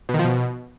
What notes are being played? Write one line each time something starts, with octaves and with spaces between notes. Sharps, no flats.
B2
D#3
F3
B2